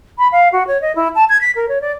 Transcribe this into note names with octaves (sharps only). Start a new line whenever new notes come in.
B5
F5
F#4
C#5
D#5
E4
A5
G#6
B6
A#4
C#5
D5